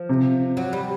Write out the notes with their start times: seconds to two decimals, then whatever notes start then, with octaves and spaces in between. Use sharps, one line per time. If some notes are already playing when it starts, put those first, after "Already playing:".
Already playing: F3
0.09 C3
0.57 F#3
0.73 G3